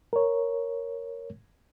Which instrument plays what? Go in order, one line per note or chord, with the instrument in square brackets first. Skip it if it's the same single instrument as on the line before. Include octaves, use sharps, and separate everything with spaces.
[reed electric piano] A#4 C#5